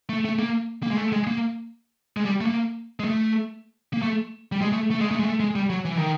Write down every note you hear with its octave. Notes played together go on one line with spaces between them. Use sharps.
A3
A3
A#3
A#3
G#3
A3
G#3
A#3
G#3
G3
A3
A#3
G#3
A3
A#3
A3
G3
G#3
A3
A3
G#3
A3
G#3
A3
G#3
G3
F#3
E3
D#3